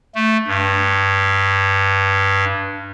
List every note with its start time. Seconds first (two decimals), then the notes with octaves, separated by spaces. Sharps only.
0.15 A3
0.47 G2